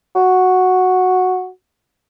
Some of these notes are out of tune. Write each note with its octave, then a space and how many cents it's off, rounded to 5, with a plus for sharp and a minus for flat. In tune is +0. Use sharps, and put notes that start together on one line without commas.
F#4 -5